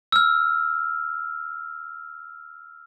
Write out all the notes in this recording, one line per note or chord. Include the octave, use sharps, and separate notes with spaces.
E6 F6